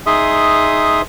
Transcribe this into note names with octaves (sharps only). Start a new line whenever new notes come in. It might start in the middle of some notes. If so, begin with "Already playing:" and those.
D#4 G#4 E5 C6 D#6